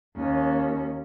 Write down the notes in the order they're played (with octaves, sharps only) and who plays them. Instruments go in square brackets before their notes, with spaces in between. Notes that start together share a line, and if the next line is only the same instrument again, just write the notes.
[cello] D#2 C#4